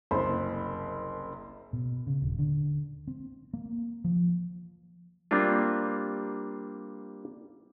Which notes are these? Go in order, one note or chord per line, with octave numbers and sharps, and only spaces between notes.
F#1 C2 C5 B5 C6
B2
C#3
D#1
D3
C4
A#3
F3
G3 A#3 C4 D4 F4